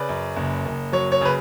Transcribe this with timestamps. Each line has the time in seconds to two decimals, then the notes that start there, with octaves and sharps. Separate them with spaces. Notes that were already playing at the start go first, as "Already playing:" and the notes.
Already playing: C#3 B4 D5
0.09 F#2
0.36 F#1
0.65 F#1
0.92 F#3 C#5
1.12 C#5
1.21 C#3 B4